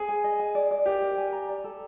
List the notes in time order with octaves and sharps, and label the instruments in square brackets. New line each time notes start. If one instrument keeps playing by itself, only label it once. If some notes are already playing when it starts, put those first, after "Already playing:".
Already playing: [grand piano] G#4
[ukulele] G#5
D#5
G#5
D5
D5
[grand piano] G4 [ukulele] A#4
[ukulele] A#4
G#5
A#5
D5
A4